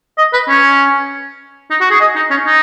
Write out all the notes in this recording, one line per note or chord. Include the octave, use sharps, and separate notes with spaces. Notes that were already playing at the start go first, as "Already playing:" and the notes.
D#5
B4
C#4
D#4
F#4
G#4
D#5
D#4
C#4
D#4